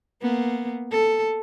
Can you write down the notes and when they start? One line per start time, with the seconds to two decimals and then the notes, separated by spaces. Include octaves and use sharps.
0.21 A#3 B3
0.91 A4